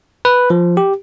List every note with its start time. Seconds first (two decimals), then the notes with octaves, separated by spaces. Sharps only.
0.25 B4
0.50 F3
0.77 G4